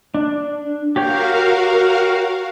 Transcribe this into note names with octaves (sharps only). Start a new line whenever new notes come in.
D4
F#4 G4 A#4 C#5 F5 G5